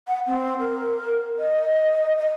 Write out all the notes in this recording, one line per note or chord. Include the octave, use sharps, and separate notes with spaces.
F#5
C4
A#4
D#5
D#5